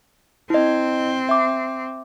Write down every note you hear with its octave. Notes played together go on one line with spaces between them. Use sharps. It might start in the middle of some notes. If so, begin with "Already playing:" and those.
C4 E4 D#5
E5 D6